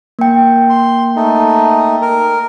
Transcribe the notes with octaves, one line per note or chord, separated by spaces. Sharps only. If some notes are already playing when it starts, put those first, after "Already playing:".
A#3 G5
C6
A3 D#4
A#4